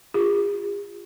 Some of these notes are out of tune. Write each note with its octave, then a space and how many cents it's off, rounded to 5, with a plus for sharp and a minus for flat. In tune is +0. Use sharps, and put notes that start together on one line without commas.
F4 +0 G#4 -45